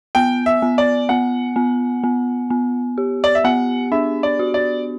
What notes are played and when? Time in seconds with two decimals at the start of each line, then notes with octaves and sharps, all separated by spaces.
0.15 B3 G5
0.46 E5
0.62 B3
0.78 D5
1.09 B3 F#5
1.56 B3
2.04 B3
2.50 B3
2.98 G4
3.24 D5
3.35 E5
3.44 B3 F#5
3.92 D4 E5
4.23 D5
4.39 F#4
4.54 D5